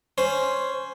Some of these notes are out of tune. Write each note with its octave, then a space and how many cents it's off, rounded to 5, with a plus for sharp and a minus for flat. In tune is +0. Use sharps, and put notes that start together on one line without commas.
C#4 +0 C5 +0